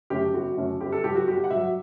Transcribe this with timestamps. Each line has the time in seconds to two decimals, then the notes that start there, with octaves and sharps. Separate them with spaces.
0.10 F#2 D3 A3 C#4 G4
0.34 G1 F#4
0.57 F#2 D3 A3 C#4
0.80 G1 G4
0.92 A4
1.04 G2 F#3 G4
1.16 F#4
1.28 G1 G4
1.44 F#5
1.50 G2 F#3 E5